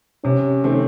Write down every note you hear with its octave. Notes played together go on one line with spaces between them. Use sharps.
C3 C#4
D#3 A3 C4